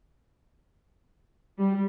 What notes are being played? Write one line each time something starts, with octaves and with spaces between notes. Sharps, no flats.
G3